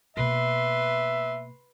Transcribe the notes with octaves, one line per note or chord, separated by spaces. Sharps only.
B2 A#3 B4 E5 C6